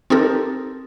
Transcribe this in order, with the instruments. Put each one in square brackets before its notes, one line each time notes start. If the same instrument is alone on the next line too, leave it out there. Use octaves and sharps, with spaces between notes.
[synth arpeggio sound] C4 D#4 G4 A4 A#4